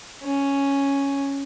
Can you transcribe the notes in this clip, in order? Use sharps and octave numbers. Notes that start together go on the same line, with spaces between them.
C#4